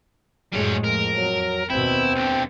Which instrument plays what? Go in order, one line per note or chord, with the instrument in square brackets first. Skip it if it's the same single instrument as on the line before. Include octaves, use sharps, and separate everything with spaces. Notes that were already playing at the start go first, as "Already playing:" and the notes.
[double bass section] F#2 A2 G#3 [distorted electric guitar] G3 C#5
[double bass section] F2 [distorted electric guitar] A#4
[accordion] F#3
[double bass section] D#2 B2 [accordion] C4 G5 [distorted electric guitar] E4
[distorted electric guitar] B1 D3